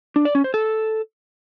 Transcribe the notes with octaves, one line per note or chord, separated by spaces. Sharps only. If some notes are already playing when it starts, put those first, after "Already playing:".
D4
D5
C#4
C5
A4